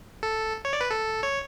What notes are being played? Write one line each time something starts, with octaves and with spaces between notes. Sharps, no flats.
A4
C#5
D5
B4
A4
C#5